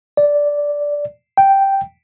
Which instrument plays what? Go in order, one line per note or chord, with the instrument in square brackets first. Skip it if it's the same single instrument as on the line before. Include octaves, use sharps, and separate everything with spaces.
[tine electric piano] D5
G5